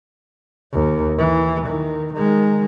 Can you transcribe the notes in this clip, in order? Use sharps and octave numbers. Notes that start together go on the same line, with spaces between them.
D#2
E3
D#3
D#3 G#3